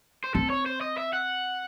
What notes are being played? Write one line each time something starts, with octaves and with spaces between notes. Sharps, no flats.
C5
C4 A4
C#5
C5
D#5
E5
F#5